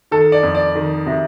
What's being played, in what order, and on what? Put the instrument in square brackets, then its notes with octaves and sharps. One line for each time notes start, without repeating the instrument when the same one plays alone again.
[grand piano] D#3 A4
D5
F2
D5
D#3
C3